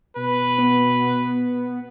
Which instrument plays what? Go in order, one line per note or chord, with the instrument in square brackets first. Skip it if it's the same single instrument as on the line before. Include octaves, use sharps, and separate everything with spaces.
[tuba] B2 [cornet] B4
[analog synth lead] B3